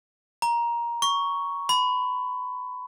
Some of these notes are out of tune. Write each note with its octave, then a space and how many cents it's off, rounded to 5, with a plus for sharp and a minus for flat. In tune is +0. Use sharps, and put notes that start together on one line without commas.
A#5 +15
C#6 +5
B5 +25